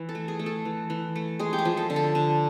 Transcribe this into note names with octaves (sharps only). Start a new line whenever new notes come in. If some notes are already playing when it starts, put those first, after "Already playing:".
Already playing: E3
A4
A3
G#4
A3
A4
E3
E3
A3
G#3 G#4
G4
G#4
F3
A4
D3
A4
D3